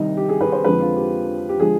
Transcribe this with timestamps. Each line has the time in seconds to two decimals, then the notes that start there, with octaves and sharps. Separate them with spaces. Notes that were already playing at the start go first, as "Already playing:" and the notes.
Already playing: C2 C3 D#3 G3 D#4
0.17 G4
0.29 G#4
0.41 B4
0.52 C5
0.64 F2 D3 F3 G#3 B4
0.80 F4
0.96 G4
1.49 G4
1.59 D3 F3 G#3 G#4